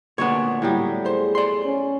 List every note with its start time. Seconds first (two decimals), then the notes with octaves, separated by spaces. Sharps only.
0.18 D2 A#2 B3 D4 C#5
0.62 A2 F#3 G3
1.06 G#4 C5
1.35 D5 C6
1.65 C#4